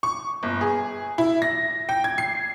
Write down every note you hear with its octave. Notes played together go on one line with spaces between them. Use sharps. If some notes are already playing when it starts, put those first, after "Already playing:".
C#6
G1
G#4
E4
A#6
G5
G#6
C7